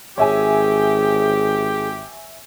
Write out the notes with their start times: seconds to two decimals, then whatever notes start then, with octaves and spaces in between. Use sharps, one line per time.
0.18 G#1 G4 G#4 C#5 E5 G#5